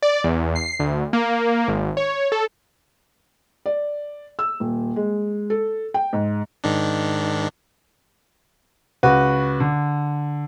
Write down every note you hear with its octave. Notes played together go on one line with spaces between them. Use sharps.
D5
E2
C7
D2
A#3
G#1
C#5
A4
D5
E6
D#1
G#3
A4
G5
G#2
G#2 D#3 D4
C#2 F#4 B4
D3